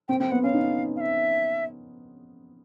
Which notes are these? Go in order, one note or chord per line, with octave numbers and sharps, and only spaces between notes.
C4 G5
C4 G5
B3 F#5
C#4 F5
D#4
F5
E5